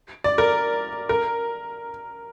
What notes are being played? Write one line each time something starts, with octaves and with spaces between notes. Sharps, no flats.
D5
A#4
A#4